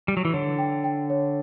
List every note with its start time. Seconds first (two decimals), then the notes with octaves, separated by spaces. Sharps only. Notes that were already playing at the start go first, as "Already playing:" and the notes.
0.08 G3
0.17 F#3
0.25 E3
0.33 D3 C#5
0.58 G5
0.84 G5
1.10 C#5